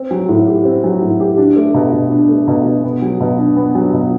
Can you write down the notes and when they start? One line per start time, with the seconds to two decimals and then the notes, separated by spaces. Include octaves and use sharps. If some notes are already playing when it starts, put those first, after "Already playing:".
Already playing: C4
0.11 F#3
0.29 A2
0.47 G4
0.65 C4
0.84 F#3
1.02 A2
1.20 G4
1.38 D4
1.56 A3
1.74 B2
1.93 B2
2.11 D4
2.29 A3
2.48 B2
2.66 B2
2.84 B3
3.02 F#3
3.21 B2
3.38 D4
3.56 B3
3.75 F#3
3.94 B2